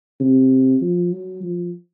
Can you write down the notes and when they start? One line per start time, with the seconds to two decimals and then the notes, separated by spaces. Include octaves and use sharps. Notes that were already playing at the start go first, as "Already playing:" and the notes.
0.20 C3
0.81 F3
1.12 F#3
1.43 F3